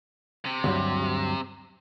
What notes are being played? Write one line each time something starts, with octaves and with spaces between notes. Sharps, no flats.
C3
D2 G2 F#3